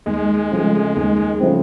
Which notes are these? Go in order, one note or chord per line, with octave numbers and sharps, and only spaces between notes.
D#2 G#3
C#3 F3 A3 C4
D#2
C#3 F3 A3 C4